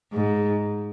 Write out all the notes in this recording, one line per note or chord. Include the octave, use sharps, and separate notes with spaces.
G#2